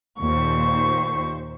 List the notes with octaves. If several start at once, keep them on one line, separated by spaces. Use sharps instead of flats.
D#2 A#2 C5 C#6